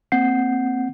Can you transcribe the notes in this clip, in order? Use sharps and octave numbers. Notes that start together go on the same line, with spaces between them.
A#3 C4 F#5 G6 C7